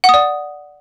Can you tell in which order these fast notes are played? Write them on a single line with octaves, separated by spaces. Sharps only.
F#5 D#6 D5